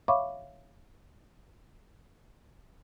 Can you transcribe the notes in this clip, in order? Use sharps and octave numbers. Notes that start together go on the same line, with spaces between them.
C#5 E5 F5 B5 C#6 D6